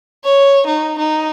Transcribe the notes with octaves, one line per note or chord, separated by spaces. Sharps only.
C#5
D#4
D#4